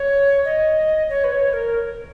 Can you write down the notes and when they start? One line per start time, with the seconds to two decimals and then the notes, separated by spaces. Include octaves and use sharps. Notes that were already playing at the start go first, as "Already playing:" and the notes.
Already playing: C#5
0.45 D#5
1.09 C#5
1.24 B4
1.32 C#5
1.53 A#4